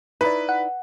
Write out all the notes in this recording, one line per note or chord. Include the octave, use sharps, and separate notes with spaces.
D#4 E4 B4 D5
F#5